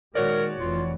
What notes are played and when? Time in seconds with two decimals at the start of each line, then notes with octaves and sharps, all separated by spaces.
0.15 A#2 D#3 G#3 F#4 A#4 C#5 D5
0.60 F1 F2 E3 F4